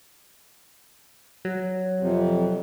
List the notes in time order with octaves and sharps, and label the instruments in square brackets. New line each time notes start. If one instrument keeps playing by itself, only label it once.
[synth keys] F#3
[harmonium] F2 C3